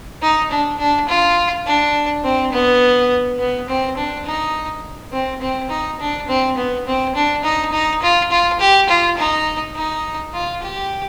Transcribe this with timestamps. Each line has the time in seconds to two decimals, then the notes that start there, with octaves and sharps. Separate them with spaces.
0.22 D#4
0.51 D4
0.78 D4
1.08 F4
1.66 D4
2.24 C4
2.52 B3
3.39 B3
3.69 C4
3.97 D4
4.26 D#4
5.13 C4
5.41 C4
5.70 D#4
6.00 D4
6.28 C4
6.57 B3
6.87 C4
7.15 D4
7.44 D#4
7.72 D#4
8.02 F4
8.31 F4
8.60 G4
8.89 F4
9.17 D#4
9.75 D#4
10.33 F4
10.62 G4